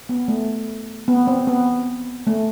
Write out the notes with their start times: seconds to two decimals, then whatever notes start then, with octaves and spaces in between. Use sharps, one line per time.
0.09 B3
0.28 A3
1.08 B3
1.27 C4
1.47 B3
2.27 A3